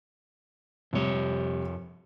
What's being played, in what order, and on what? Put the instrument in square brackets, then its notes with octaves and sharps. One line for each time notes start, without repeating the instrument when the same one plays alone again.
[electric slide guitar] F2 C#5 [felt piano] C3 G3